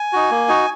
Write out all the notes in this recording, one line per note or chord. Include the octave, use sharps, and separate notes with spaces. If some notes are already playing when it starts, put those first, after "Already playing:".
Already playing: G#5
D#4 F#4
A#3
D#4 F#4